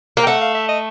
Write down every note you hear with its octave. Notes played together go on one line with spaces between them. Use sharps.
A#3
G5
A3 F#5
F5
E5
D#5